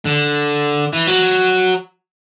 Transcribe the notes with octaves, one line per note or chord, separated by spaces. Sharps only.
D3
E3
F#3